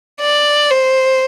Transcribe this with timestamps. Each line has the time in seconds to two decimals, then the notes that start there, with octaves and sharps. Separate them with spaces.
0.21 D5
0.70 C5